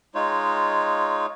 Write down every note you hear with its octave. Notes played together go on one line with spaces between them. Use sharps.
G#3 D#4 F4 C#5